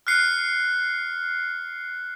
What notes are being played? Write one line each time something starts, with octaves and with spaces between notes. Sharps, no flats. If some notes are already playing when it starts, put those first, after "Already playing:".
F6 F#6 C7 C#7